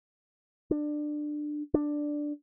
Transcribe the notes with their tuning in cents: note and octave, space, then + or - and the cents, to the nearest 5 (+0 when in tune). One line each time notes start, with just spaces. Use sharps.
D4 +20
D4 +5